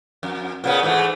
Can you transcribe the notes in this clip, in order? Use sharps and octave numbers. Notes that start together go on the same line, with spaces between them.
F2
A#2 C#3 B3
G#2 E3 A3